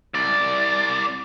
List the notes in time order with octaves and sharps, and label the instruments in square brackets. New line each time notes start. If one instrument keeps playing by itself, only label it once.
[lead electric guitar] C2 D5